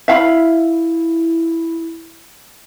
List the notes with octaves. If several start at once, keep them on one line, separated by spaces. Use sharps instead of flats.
E4 E5 F5 B5